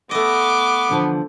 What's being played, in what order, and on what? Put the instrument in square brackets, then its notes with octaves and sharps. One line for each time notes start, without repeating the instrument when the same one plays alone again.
[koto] A3 D#5 [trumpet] B3 [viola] D6
[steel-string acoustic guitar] E2 D3 F3